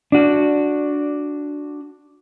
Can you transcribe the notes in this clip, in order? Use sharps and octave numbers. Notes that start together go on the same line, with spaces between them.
D4 F#4